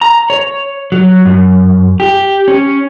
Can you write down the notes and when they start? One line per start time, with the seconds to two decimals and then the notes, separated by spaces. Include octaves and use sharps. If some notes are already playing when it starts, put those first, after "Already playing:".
0.01 A#5
0.30 C#5
0.92 F#3
1.25 F#2
2.00 G4
2.48 C#4